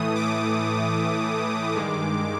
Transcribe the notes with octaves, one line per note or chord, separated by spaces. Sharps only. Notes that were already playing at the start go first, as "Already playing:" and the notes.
Already playing: A2 E3 A3 D#6
D6
G2 D#3 G#3